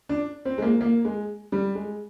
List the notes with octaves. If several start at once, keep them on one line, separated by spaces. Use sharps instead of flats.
D4
C4
G#3
A#3
A#3
G#3
G3
G#3